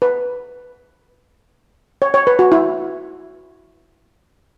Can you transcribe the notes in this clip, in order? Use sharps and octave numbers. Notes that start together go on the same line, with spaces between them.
B4
C#5
C#5
B4
F#4
E4